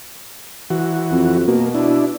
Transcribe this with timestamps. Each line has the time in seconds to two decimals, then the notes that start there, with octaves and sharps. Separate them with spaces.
0.70 E3 F#4
1.12 F2
1.48 B2 A#3
1.75 D4 E4